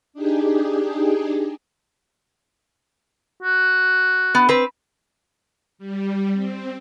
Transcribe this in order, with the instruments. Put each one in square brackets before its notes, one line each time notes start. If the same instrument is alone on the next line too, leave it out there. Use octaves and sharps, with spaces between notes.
[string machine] D4 D#4 G4 G#4
[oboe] F#4
[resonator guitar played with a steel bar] B3
C4 B4
[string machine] G3
C4